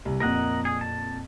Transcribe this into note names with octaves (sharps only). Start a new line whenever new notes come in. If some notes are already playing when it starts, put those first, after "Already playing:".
C2
F2 A#2 A#4 D#5 F#5
G#4
A5